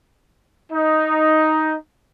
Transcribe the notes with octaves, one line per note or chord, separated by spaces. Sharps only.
D#4